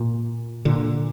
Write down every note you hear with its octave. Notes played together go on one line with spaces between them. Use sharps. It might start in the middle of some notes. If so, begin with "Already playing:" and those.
Already playing: A#2
A#2 D3